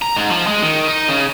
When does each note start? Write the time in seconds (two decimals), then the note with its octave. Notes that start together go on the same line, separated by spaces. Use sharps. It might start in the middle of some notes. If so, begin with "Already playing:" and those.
0.02 A#5
0.16 G#2
0.30 F3
0.47 G#3
0.62 D#3
0.88 D#4
1.08 C#3